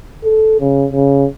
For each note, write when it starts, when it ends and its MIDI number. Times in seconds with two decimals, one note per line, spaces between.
0.24 0.55 69
0.60 0.86 49
0.92 1.25 49